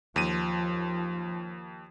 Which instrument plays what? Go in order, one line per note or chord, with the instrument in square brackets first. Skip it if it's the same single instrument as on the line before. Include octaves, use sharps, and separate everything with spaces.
[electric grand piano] D#2 D#7 [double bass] F3